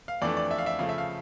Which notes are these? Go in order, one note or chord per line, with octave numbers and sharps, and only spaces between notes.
F5
F2 E3 A3 D4 D5
D5
E5
F5
E5
C#3 F3 A3 F5
E5
F5